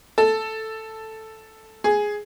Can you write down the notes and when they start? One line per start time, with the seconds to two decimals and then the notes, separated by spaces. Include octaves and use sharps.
0.18 A4
1.84 G#4